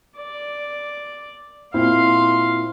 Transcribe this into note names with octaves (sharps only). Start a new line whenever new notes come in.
D5
A#2 C4 E4 F5 C6